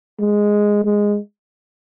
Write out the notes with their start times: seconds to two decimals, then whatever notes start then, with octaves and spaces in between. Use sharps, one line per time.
0.19 G#3
0.84 G#3